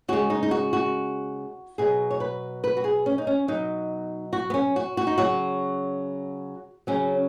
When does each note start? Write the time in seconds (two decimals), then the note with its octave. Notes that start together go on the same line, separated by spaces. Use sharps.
0.08 C#3 G#3 F#4
0.30 D#4
0.43 D#4
0.51 F#4
0.73 F#4
1.78 B2 F#3 G#4
2.11 C#5
2.20 B4
2.64 B4
2.77 F#4
2.84 G#4
3.06 C#4
3.18 D#4
3.27 C#4
3.48 B2 F#3 D#4
4.33 F#4
4.50 B3
4.54 C#4
4.76 F#4
4.97 F#4
5.07 D#4
5.18 C#3 F#3 F#4
6.87 C#3 F#3 C#4